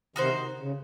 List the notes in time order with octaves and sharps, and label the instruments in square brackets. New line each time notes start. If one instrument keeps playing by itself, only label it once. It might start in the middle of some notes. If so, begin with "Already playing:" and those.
[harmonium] C3 D#3 [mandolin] D#4 F#4 C5
[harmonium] C#3